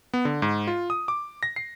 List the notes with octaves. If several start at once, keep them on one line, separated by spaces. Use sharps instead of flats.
B3
D3
G#2
F4
D#6
D6
A#6
C7